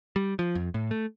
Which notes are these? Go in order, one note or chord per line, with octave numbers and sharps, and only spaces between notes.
G3
F3
F2
A2
A3